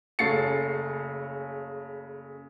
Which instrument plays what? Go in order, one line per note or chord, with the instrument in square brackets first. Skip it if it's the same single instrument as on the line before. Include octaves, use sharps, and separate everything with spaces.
[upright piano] F#1 C#3 A3 A6 C7 C#7